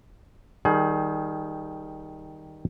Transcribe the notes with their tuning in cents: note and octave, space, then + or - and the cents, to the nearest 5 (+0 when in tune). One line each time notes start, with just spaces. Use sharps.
D#3 +0 G3 +0 G#4 +25